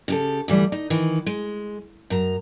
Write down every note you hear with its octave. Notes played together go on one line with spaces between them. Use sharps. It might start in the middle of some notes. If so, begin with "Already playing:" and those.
C#3 G4 A4
D2 E3 G3
D#4
D#3 E3
G#3
F#2 A#5